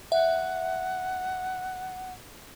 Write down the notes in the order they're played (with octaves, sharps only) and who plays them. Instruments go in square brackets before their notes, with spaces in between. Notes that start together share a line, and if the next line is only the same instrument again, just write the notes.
[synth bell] E5 [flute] F#5